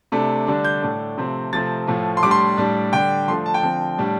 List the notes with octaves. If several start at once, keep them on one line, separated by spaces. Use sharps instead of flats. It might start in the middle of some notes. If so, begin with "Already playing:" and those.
C3 A3 D4
D3 G3 D4
G6
A2 A3 D4
C3 F3 A3 C4
C3 F3 A3 C4 A6
A2 F3 A3
C6
A2 G3 D4 D6
C6
A2 G3 D4
D3 G3 D4 G5
F3 A3 D4 C6
A5
G5
D3 F3 C4
A2 G3 D4